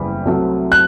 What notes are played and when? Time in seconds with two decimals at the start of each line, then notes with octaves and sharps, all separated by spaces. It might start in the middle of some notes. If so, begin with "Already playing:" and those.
Already playing: F#1 E2 G3
0.25 C2 C3 F#3 A3
0.72 F#6